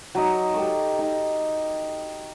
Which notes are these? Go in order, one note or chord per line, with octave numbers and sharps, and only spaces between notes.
F#3 D#4
G4 A4 C#6
D#4